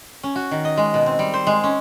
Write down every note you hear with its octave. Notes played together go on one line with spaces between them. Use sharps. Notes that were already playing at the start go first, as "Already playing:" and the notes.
C#4
F#4
D#3
D#5
G#3
B2
C4
G3
C5
G#3
C#4